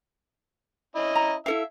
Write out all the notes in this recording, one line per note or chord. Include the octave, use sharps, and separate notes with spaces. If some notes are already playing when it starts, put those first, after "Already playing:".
C#4 E4 D#5
A#5
E4 A4 E5 F5